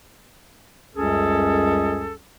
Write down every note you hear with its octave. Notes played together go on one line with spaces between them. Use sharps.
C#2 F#2 G3 C#4 G#4 A4